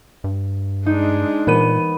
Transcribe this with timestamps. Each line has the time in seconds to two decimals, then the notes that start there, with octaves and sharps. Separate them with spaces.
0.24 G2
0.86 G#3 D4 D#4
1.47 A#2 E3 B3 A#4 D#7